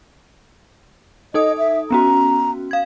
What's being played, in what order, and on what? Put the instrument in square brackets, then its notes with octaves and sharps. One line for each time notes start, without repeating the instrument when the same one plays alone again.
[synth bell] D#4 A4 D#6 [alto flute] D#5
[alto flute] E5
[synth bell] B3 C#4 F#4 [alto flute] A#5
[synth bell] F5 G#6